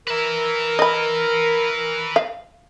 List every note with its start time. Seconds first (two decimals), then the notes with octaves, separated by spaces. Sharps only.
0.07 A#4 B4 E5
0.79 D#5 B5
2.16 F5